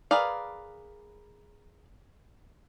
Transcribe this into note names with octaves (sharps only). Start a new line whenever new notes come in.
G#4 A#4 B4 D5 F5